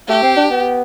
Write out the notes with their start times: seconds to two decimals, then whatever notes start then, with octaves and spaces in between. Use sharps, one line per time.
0.08 A3 G4
0.23 C4
0.37 D4
0.50 B3